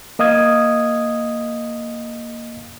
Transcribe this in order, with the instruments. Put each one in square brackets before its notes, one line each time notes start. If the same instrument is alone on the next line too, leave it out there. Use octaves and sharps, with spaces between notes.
[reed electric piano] A#3 D#5 F5 D#6 G#6